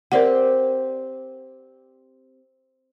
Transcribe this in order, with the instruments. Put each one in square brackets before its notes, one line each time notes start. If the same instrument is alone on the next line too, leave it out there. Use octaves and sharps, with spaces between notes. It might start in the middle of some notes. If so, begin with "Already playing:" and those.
[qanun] C4 G4 [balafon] A#4 D5 F#5